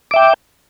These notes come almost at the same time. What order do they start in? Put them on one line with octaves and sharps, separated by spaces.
D6 E5 G5